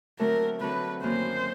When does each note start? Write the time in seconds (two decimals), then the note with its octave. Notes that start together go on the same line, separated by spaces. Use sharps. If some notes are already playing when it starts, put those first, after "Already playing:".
0.19 D3 F#3 A3 C4 A#4
0.61 D3 F#3 A3 C4 B4
1.03 F#2 D#3 F#3 A#3 C5